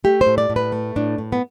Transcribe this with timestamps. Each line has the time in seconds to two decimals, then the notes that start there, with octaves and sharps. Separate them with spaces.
0.04 A3 G4
0.21 C5
0.26 A2
0.38 D5
0.50 A2
0.56 B4
0.72 A3
0.96 A2 D4
1.18 A2
1.32 B3